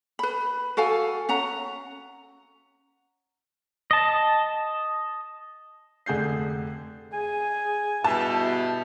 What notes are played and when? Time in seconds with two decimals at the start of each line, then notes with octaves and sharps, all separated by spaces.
0.19 B4 B5
0.77 F#4 A4 F5 G#5
1.29 C#4 F#5 A#5
3.91 D#5 A5
6.06 F1 D3 G#4 G6 C7
7.14 G#4 G#5
8.04 G2 B2 E4 A5